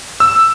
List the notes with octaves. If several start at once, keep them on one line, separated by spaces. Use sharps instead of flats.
E6